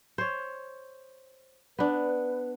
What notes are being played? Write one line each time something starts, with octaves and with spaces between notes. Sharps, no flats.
C5 C#5
B3 D4 B4